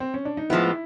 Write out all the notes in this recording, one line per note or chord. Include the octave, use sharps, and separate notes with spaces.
C4
C#4
D4
D#4
A2 F3 G#3 B3 E4